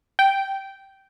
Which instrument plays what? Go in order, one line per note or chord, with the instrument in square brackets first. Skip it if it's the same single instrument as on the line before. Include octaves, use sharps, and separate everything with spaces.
[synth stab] G5